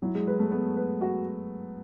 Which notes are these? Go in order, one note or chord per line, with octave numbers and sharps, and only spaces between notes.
F#3 E4
G#3
G#3 B4
A3
A3 B3
B4
F#4